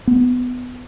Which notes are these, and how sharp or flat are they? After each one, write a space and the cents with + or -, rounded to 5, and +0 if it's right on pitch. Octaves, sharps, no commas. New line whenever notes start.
B3 +15